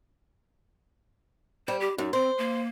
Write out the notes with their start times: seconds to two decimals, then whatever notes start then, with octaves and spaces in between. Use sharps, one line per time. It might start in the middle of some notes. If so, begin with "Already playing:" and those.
1.68 G3 C5
1.80 G4
1.98 F#2 D#4
2.13 C4 C5
2.38 A#3